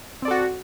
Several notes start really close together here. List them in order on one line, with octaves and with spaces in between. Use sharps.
C4 D5 A4 F#4